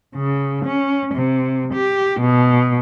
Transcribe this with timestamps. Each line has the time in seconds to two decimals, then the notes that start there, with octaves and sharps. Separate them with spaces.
0.15 C#3
0.66 C#4
1.15 C3
1.74 G4
2.21 B2